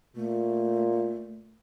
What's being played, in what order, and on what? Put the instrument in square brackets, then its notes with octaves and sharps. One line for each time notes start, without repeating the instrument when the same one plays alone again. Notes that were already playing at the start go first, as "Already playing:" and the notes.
[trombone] A#2 [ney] A3